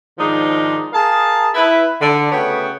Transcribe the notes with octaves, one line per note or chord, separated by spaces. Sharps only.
G#2 D#3 F3 G#3 D4 D#4
G#4 A#4 F5 A5
E4 B4
D3
C#3 A3 B3 F#4 C#5 G5